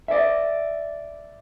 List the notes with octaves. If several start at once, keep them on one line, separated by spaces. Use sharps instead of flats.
D5 E5